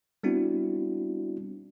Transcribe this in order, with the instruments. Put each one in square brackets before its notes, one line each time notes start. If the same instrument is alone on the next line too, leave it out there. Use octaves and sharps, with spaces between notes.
[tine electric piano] G3 B3 C4 D4 E4 F#4